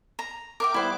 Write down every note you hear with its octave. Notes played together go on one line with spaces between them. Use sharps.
A#5
A#4 E5 G5 D6
G3 B3 E4 C5